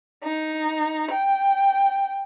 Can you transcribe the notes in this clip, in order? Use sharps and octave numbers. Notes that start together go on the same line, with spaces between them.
D#4
G5